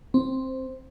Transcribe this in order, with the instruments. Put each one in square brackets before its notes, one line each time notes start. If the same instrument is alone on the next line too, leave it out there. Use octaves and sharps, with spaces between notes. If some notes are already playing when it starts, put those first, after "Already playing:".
[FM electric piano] C4